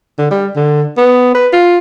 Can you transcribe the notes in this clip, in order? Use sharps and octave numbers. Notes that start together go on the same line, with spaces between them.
D3
G3
D3
B3
B4
F4